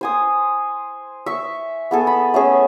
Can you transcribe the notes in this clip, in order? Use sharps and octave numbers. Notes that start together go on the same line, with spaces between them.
C5 G#5 D#6
E5 C#6
B3 G#4 A4
B5
A3 C#4 G#4